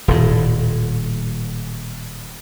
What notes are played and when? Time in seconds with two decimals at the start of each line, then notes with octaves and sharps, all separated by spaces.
0.08 D#1 A2